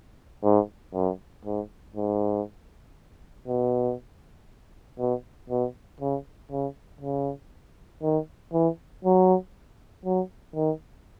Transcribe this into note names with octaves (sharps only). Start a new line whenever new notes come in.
G#2
F#2
G#2
G#2
B2
B2
B2
C#3
C#3
C#3
D#3
E3
F#3
F#3
D#3